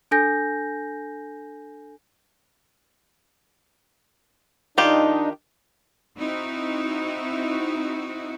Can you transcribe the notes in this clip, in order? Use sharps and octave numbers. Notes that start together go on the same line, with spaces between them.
D4 A4 G#5 G6 A#6
D#3 D4 D#4 F4 G4
C4 D#4 E4 F#4